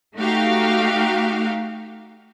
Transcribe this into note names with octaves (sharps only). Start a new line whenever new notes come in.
A3 D#4 F#4 G4 F5